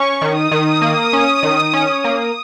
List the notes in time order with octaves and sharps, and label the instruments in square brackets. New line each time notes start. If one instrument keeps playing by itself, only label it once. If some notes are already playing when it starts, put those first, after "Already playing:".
Already playing: [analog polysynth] C#4 [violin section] C#6
[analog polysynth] D#3
[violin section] D#6
[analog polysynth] D#3
A#3
C#4
D#3
C#4
A#3